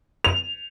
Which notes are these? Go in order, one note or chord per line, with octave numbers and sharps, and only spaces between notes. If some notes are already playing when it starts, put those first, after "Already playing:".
F7